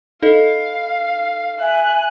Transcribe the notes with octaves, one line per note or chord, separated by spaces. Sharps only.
D#4 A4 D#5 F5
E5 G#5 F#6